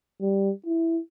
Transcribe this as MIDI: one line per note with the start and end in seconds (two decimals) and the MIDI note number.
0.21 0.51 55
0.66 0.99 64